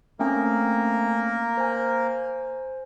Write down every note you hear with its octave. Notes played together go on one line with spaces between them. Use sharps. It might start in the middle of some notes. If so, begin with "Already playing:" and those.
A3 A#3 C4 C#4 A#4
C5 G#5